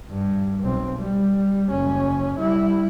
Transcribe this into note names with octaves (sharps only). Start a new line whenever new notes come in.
G2
B1 C4
G3
F#1 C#4
G3 E4